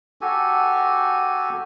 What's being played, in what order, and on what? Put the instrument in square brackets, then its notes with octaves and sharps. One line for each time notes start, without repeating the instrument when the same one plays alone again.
[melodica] F#4 G4 A4 G#5